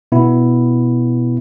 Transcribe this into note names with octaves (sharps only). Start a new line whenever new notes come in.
B2 B3 E4